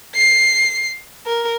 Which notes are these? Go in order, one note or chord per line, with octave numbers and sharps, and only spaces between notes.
C7
A#4